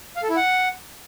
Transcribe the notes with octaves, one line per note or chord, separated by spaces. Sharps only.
F5
A4
E4
F#5